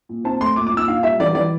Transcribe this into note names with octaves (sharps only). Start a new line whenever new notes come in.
A#2
C4 A5
A3 C6
A#2 D6
D6
A#2
E6
D4 F5
G3 E5
E3 D5
E3 D5